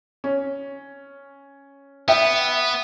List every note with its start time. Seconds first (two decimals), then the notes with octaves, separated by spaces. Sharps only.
0.24 C#4
2.08 B3 E5 G5